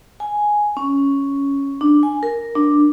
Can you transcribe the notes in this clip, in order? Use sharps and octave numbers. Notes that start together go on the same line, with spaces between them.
G#5
C#4
D4
G#5
A#4
D4